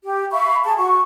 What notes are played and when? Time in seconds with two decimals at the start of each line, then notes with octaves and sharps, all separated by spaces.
0.05 G4
0.31 E5 F5 B5 C#6
0.64 G#4 A5
0.78 F#4 C#6